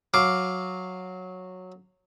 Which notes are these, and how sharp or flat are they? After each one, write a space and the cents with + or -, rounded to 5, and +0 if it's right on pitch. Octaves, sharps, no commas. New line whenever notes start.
F#3 -10 F5 +0 D6 +0